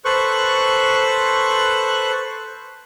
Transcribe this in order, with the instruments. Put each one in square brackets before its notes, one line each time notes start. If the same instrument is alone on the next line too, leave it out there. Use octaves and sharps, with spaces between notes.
[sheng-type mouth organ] A4 B4 C5 C#6 F#6